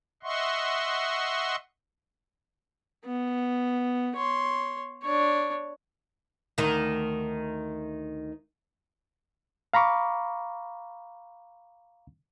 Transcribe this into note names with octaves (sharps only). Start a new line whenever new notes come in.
D#5 E5 F#5 C6 C#6
B3
C#5 C6
D4 C#5
D2 D#3
F5 A#5 B5 C#6 D6